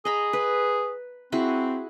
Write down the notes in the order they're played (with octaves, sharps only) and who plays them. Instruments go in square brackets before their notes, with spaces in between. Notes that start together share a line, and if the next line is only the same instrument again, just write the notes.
[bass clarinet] G#4 [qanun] D#5 A#5 B5
[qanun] B4
[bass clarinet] C4 [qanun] E4 F#4 G#4